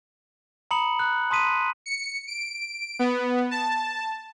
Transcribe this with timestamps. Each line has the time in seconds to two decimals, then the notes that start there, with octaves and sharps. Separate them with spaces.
0.71 A#5 B5 D#6 C#7 F#7
0.99 F#6
1.30 A5 C6 D#6 B6 D#7
1.86 C#7
2.28 D7
2.99 B3
3.51 A5